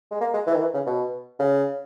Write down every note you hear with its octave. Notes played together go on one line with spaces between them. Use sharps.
G#3
A#3
G#3
E3
D#3
E3
C#3
B2
C#3